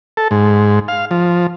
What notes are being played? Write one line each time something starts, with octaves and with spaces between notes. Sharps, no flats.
A4
G#2
F5
F3